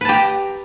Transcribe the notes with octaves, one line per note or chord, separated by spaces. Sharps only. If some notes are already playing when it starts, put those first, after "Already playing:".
G4 B4 A5 A#5